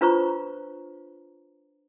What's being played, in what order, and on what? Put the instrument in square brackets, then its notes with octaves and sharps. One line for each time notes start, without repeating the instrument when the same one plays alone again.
[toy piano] D4 F4 B4 C5 A#5 C#6